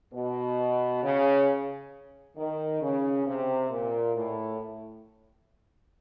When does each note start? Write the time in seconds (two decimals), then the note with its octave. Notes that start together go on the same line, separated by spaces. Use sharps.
0.14 B2
1.03 C#3
2.37 D#3
2.82 C#3
3.26 C3
3.70 A#2
4.15 A2